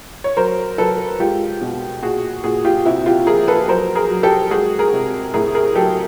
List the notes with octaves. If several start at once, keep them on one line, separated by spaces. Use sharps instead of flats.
C#5
F#3 A#4 C5
F#3 A4 B4
G#3 F4 G4
B2
A#2 F#4 G#4
A#2 F#4 G#4
F4 G4
C3 E4 F#4
F4 G4
F3 G#4 A#4
A4 B4
F#3 A#4 C5
G#4 A#4
F#3
G4 A4
G#3 F#4 G#4
G#4 A#4
C3
A2 G#4 A#4
G#4 A#4
F#3 G4 A4